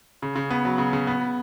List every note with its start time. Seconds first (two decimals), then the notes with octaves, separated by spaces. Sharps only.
0.22 C#3
0.36 C#3
0.50 B3
0.65 F#3
0.78 C#3
0.93 C#3
1.07 B3